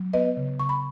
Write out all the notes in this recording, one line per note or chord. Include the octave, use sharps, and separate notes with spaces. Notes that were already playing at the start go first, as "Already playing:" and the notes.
Already playing: F#3
B3 B4 D#5
C#3
C#3 C#6
B5